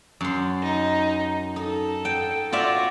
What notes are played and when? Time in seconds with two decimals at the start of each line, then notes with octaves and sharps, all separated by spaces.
0.21 F#2 C6
0.63 D#4
1.56 D#4 A4
2.05 G5
2.52 F4 F#4 D5 E5